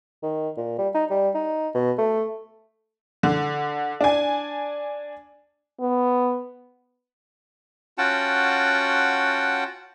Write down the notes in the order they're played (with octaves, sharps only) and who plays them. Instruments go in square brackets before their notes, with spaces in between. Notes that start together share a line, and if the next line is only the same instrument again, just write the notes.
[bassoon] D#3
A#2
G3
D#4
G3
D#4
B2
A3
[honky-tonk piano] D3
D4 G#5
[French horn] B3
[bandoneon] C#4 F4 F#4 F#5 G5 A5